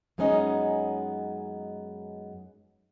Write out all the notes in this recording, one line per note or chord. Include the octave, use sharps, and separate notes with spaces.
F#2 G#3 B3 C#4 D#4 D#5